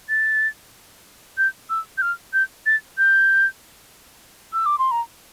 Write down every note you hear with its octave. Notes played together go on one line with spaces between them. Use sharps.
A6
G6
E6
G6
F6
G6
A6
G6
E6
D6
C6
A#5